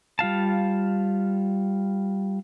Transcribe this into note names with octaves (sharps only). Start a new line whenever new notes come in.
G3 F4 F5 A5